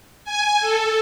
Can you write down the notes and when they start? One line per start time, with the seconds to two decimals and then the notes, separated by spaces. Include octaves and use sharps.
0.24 G#5
0.60 A4